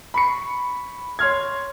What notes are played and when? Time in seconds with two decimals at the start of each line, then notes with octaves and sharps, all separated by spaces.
0.14 B5 C#6 C#7
1.19 C#5 C6 F6 G#6